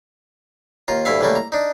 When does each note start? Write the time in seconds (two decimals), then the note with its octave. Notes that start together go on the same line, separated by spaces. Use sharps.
0.88 D#2 F4 A#5
1.05 D2 G2 E4 E5 F5
1.21 C#2 E3 G3 A3 A#3
1.35 A#5
1.52 D4 D#4